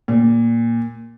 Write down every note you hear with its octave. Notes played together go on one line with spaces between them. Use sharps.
A#2